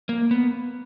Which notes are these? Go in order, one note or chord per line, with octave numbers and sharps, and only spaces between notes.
A#3
B3